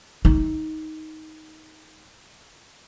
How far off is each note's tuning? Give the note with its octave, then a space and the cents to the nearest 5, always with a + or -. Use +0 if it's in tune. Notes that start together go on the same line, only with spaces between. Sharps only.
D#4 +10